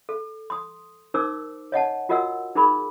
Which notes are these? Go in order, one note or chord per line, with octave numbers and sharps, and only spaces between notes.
A4
C6 D#6
D#4 A#4 C5 D6 E6
C#5 D#5 F#5 A5
F4 F#4 A#4 D#5 F#5 E6
D#4 G#4 A#4 B5 D6